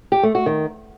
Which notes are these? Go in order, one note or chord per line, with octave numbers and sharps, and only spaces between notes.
G4
A3
F#4
D#3